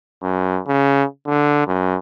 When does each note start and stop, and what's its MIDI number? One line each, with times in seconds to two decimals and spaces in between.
0.23 0.59 42
0.67 1.04 49
1.26 1.66 50
1.67 1.98 42